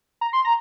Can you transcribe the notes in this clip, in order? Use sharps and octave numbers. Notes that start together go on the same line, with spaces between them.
A#5
C6
A#5